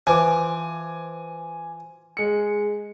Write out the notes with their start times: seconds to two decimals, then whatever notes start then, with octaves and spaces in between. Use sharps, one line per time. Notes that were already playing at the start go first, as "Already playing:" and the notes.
0.07 E3 F3 G#5 D6
2.17 G#3 C#7